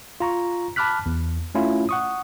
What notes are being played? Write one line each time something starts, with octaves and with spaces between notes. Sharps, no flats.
F4 A#5 C#6
A5 B5 D6 F6 F#6 B6
E2
A3 C#4 E4 F4
F#5 C#6 D#6